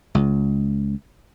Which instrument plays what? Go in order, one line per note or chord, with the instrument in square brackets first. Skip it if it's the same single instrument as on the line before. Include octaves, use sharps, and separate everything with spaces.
[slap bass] C#2